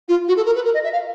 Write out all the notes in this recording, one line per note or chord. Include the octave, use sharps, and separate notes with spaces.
F4
F#4
A4
A#4
B4
A#4
D#5
E5
F5